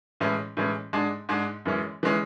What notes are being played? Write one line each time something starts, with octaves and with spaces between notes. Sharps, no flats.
A2 E3 G#3 C#4
A2 E3 G#3 C#4
G#2 G#3 D4
G#2 G#3 D4
F#2 E3 G#3 C#4
E3 G#3 C#4